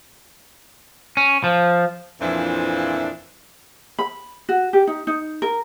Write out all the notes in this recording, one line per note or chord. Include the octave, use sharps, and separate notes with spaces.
C#4
F3
F2 A#2 E3 F3 D4 E4
B5
F#4
G4
D#4
D#4
A#4